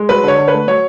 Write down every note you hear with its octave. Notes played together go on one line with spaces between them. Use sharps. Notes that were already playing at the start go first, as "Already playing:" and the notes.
Already playing: G#3
F#3 B4
D3 C#5
D3
B4
A3
F#3 C#5